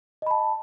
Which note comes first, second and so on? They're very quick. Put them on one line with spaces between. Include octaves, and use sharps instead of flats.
D#5 B5 A5